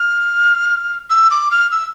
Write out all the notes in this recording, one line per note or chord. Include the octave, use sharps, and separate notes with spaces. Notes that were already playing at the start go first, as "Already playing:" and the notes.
Already playing: F6
E6
D6
F6
E6